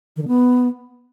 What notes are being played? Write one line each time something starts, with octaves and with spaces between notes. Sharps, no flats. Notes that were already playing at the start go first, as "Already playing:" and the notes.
D#3
D3
B3